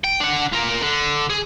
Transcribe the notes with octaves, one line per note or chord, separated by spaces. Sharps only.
G5
D4 F#5
F4 A#4
D3
G#4